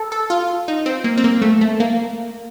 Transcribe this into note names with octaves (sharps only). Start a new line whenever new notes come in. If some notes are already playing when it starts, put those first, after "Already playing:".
Already playing: A4
A4
F4
D#4
C4
A#3
C4
A#3
A3
A3
A#3